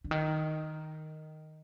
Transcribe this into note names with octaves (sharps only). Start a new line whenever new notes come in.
D3
D#3